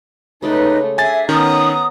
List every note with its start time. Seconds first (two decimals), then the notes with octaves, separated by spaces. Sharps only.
0.42 C#3 G#3 A3 D#4 B4 D5
0.98 D4 G#4 E5 F#5 G#5 A6
1.29 D#3 B3 C#4 C#5 D5 G#5 A#5 D#6